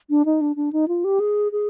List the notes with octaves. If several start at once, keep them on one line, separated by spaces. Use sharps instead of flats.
D4
D#4
D4
D4
D#4
F4
G4
G#4
G#4